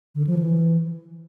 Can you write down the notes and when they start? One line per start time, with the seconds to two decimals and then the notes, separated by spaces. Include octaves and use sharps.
0.15 D3
0.27 F3
0.39 E3